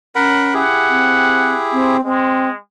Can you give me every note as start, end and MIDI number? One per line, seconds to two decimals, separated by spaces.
0.15 0.61 61
0.15 0.54 70
0.15 0.54 78
0.15 0.54 83
0.54 1.97 64
0.54 1.97 67
0.54 1.97 68
0.54 1.70 78
0.89 1.54 60
1.72 2.03 60
2.04 2.57 56
2.04 2.48 60